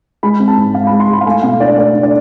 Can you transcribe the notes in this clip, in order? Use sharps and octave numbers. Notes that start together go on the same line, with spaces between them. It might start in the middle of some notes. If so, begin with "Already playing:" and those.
G#3 B5
C4
A5
G#2
G#2 F5
G#3 B5
C6
G#3 B5
F5
A3 G#5
B2 F5
D4 D5
A3 D5
D4
D5